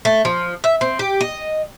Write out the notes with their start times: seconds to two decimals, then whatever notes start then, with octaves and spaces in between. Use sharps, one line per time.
0.05 A3
0.25 F3
0.64 E5
0.81 C4
0.99 G4
1.21 D#5